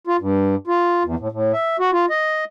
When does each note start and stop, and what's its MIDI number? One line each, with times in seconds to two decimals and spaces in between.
0.07 0.17 65
0.20 0.55 43
0.67 1.03 65
1.04 1.15 40
1.19 1.28 45
1.32 1.52 45
1.53 1.77 76
1.80 1.91 66
1.92 2.06 65
2.10 2.44 75